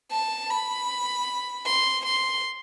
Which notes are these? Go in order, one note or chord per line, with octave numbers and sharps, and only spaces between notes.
A5
B5
C6
C6